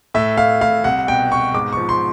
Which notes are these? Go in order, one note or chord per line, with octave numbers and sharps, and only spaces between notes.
A2 E5
A2 F5
A2 F5
C2 F#5
B2 G5
B2 C#6
G#2 D6
F3 C#6
C6